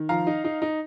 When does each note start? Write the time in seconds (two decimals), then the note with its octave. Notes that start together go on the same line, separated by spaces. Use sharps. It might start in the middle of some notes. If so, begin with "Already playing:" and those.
Already playing: D#3
0.09 F3 F5 A#5
0.27 D#4
0.44 D#4
0.62 D#4